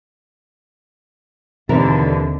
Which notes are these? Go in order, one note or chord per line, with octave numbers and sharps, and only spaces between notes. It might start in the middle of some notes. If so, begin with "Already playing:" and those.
D#2 B2 D3 E3 C4 A4 A#4